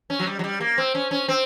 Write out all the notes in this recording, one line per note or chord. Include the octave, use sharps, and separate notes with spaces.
C#4
F#3
G3
F#3
G3
A#3
C4
C#4
C#4
C4